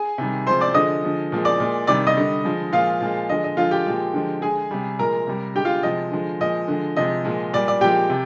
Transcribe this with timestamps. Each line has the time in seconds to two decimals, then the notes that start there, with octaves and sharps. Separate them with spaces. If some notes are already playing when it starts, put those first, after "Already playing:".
Already playing: G#4 G#5
0.18 C3 D#3 G3
0.47 C3 F3 G#3 C5 C6
0.61 D5 D6
0.74 D3 F3 G#3 D#5 D#6
1.04 D3 F3 G#3
1.32 A#2 F3 G#3
1.45 D5 D6
1.60 A#2 G#3
1.87 C3 D#3 G3 D5 D6
2.07 D#5 D#6
2.16 D3 G3
2.44 D3 F3 G#3
2.73 A#2 F3 G#3 F4 F5
3.01 A#2 F3 G#3
3.29 D3 F3 G#3 D#5
3.44 D#5
3.57 D3 F3 G#3 F4 F5
3.71 G4 G5
3.86 A#2 F3 G#3
4.14 D3 F3 G#3
4.42 D3 G#3 G#4 G#5
4.71 C3 G3
4.99 A#2 F3 G#3 A#4 A#5
5.27 C3 G3
5.55 D3 G#3 G4 G5
5.65 F4 F5
5.83 C3 F3 G#3 D#5
6.11 D3 F3 G#3
6.40 A#2 F3 G#3 D#5
6.68 D3 F3 G#3
6.96 C3 F3 G#3 D#5
7.25 A#2 F3 G#3
7.53 A#2 G3 D5
7.68 D5
7.81 A#2 F3 G#3 G4 G5
8.10 C3